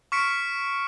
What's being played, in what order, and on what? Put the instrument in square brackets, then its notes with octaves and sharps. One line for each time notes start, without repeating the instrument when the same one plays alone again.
[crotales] C#6 F6 B6 C#7 D7